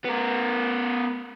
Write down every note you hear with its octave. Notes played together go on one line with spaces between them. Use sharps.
B3 A#4